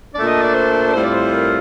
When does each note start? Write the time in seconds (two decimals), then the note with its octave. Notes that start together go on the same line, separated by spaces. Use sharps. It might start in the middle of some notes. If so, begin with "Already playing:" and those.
0.14 A#2 A3 D4 D5
0.27 D#5
0.41 D5
0.54 C5
0.93 A2 G3 C4 F4 C5
1.04 D5
1.13 C5
1.33 A#4